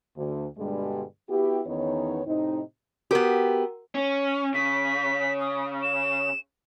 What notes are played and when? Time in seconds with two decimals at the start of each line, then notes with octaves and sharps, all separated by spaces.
0.16 D2
0.58 G2 B2 D3 G3 G#3
1.29 B3 E4 F#4 G4
1.67 E2 D#3 B3 C#4 D#4 C#5
2.27 A2 C3 C4 D#4
3.11 B3 F#4 G4 A#4
3.95 C#4
4.54 C#3 B6
5.41 D#6
5.83 E7